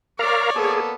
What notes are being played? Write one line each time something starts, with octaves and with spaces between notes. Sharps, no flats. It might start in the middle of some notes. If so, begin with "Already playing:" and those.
A#4 C#5 D5 F5 A#5
A#3 B3 G#4 A4